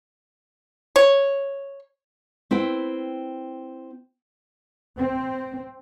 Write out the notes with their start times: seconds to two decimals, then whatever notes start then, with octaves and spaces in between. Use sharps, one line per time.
0.96 C#5
2.51 C4 E4 B4 G5
4.98 C4